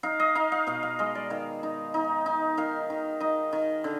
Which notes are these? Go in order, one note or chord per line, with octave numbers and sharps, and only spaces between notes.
D#4 F5
D#5
D#4 F5
F5
B2 F5
F5
G#3 D#5
D5
D#3 F5
D#4
D#4
D#4
D#3 F5
D#3
D#4 D#5
D#3
D3